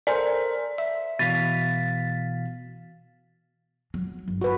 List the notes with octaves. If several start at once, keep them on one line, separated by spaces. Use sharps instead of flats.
A4 A#4 C5 D5
E5
B2 E3 F5 A6 B6
F#3
G1
F#4 B4